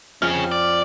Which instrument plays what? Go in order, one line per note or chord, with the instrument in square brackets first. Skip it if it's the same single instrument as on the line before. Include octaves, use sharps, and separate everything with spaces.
[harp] F2 F6 [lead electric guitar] C#4 G#4
[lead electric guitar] D5